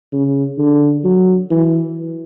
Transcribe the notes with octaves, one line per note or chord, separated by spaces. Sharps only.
C#3
D3
F#3
E3